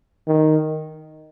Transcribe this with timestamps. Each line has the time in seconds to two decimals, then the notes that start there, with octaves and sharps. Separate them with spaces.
0.27 D#3